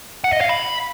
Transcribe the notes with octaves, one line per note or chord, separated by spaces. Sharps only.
F#5
D#5
F5
B5